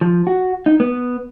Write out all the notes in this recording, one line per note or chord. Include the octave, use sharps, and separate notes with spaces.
F3
F#4
D#4
B3